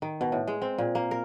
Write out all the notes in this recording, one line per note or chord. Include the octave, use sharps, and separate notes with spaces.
D#3
B2
A2
G#3
C4
A#2
A#3
A#4